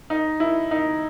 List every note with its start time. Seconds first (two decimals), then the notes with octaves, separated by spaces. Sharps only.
0.10 D#4
0.40 E4
0.71 D#4